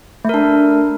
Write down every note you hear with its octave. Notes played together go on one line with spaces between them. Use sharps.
A3 D4 A#4